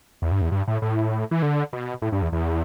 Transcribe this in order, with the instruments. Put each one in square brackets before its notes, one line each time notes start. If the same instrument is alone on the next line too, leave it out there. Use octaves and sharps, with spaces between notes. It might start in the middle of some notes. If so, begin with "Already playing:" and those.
[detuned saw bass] E2
G2
E2
G2
A2
A2
E3
D3
B2
A2
G2
E2
E2